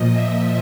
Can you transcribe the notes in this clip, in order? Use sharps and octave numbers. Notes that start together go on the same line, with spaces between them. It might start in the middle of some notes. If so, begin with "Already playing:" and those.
Already playing: A#2 F3 D#5
E5